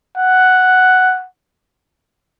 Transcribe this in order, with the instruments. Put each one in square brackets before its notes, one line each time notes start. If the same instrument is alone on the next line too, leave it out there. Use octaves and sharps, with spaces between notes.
[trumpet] F#5